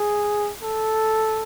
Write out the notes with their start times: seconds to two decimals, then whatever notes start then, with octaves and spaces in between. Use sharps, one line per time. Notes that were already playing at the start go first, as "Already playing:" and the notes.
Already playing: G#4
0.62 A4